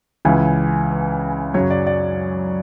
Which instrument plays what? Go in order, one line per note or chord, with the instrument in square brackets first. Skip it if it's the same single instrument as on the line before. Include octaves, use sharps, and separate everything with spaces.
[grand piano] C#2 C#3 E3 G#5
B4
F#2 C#3 F#3 C#5
D5
D5